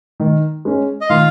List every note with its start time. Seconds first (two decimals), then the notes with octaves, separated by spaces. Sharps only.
0.20 D#3
0.65 G#3 C#4
1.01 D#5
1.09 D#3 F4 F5